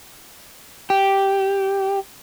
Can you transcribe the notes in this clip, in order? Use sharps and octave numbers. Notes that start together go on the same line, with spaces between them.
G4